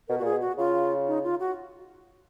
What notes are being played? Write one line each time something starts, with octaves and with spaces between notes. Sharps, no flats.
B2 A#4
F#4
A#2 G#4
B2
F#4
C#3 F4
D#4
F4
F#4